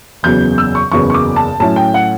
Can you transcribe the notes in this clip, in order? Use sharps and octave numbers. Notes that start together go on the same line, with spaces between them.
F#1 E2 C#3 F#3 B3 G6
E6
C#6
F#1 E2 C#3 F#3 B3 C#6
C#6
D6
A5
A2 F#3 C#4 E4 A5
G5
F#5